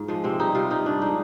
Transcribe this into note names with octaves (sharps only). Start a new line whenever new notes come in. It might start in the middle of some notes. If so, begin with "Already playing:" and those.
Already playing: G#2 F4
F3 G#3
C3 C4
G3 D#4
C3 F4
G3 D#4
G2 D4
F3 G#3 D#4